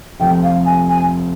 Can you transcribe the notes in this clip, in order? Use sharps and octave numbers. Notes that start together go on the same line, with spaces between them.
F1 F2 C3 F3 G5
F5
G#5
G#5